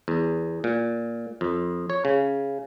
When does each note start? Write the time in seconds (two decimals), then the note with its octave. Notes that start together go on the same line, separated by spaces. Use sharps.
0.08 E2
0.64 A#2
1.41 F2
1.90 C#5
2.05 C#3